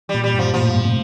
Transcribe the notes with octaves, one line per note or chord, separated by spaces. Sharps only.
G3
A#2
G3
G2
F3
A#2 F3
A2
G2
A2
C3